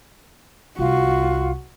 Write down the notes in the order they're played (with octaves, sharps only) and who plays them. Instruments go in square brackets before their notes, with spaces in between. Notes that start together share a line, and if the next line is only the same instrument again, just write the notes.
[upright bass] C2 [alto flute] F4 [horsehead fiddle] F#4